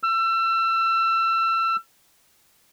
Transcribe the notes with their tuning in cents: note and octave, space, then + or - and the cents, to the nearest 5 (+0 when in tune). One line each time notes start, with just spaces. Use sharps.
E6 +30